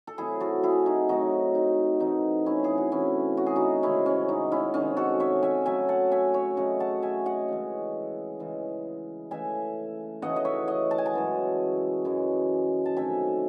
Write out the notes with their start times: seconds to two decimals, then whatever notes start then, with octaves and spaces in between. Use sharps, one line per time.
0.07 A4
0.18 C3 F#3 A3 E4 G#4
0.40 F#4 A4
0.63 E4 G#4
0.86 D#4 F#4
1.09 C3 F#3 A3 D#4 F#4
1.55 D#4
2.00 C3 E3 A3 D#4
2.46 C#4 E4
2.64 G#4
2.78 F#4
2.91 C3 E3 A3 C#4 E4
3.37 F#4
3.46 G#4
3.56 D#4 F#4
3.83 C3 D#3 G#3 C#4 E4
4.06 C#4
4.29 D#4
4.52 C#4 E4
4.74 C3 D#3 G#3 C#4
4.97 F#4 A4
5.20 C#5 E5
5.43 E5 G#5
5.65 C#3 F#3 A3 E5 G#5
5.89 F#5 A5
6.12 E5 G#5
6.34 C#5 E5
6.57 C#3 F#3 A3 D#5 F#5
6.80 F#5 A5
7.02 E5 G#5
7.26 D#5 F#5
7.48 C#3 E3 G#3
8.40 C#3 E3 G#3
9.31 C#3 E3 A3 E5 G#5
10.22 C#3 E3 A3 D#5 F#5
10.36 D#5
10.45 C#5 E5
10.68 D#5 F#5
10.91 A5
10.98 G#5
11.06 F#5 A5
11.14 F#2 E3 G#3
12.05 F#2 E3 G#3
12.86 A5
12.97 C3 D#3 F#3 A3 E5 G#5